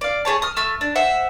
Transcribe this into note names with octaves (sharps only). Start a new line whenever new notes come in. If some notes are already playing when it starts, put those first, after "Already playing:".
D5 F5
A3 G#4 C#5 A5
D#6 F6
A3 E6 F6
D4
C5 E5 F#5